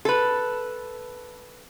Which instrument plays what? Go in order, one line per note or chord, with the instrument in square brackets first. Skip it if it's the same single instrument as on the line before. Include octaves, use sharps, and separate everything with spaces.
[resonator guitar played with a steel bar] A4 B4